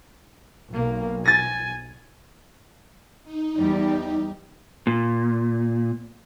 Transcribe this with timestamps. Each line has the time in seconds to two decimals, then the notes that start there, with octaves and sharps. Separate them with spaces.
0.73 B1 A#3
1.26 G#5 A6 A#6
3.24 D#4
3.58 E2 G3 G4
4.87 A#2